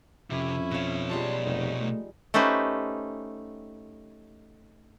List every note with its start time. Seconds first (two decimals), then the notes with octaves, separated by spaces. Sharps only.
0.30 F2 C3 C#4 E4
0.71 B2 A4 C#5 F5
1.10 F3 G3 G#3 A5 C6
1.44 F1 D#4
1.81 A3
2.34 A3 C#4 D#4 G4 B4 C5